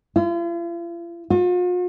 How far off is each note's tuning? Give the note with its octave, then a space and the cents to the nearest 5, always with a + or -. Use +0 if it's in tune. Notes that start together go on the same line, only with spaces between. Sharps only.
F4 -45
F4 +45